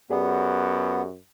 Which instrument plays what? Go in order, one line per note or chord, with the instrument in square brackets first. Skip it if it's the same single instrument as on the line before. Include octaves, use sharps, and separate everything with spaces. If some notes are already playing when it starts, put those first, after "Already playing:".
[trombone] F#2 [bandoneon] B3 [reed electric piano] G4 G#4 D5